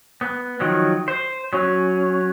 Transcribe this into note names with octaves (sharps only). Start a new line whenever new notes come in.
B3
D#3 F3 F#3
C5
F#3 C#4